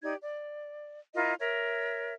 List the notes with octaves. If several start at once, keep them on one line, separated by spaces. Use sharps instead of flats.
D#4 G4 D5 G#6
D5
E4 F4 A#4 D#5
A#4 C#5 E5